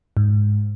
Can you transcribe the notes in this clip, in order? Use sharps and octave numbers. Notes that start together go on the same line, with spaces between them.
G#2